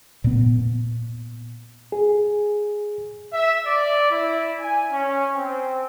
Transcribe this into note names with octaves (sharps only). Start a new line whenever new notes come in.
A#2 B3
G#4
E5
D5
E4
G#5
C#4
C4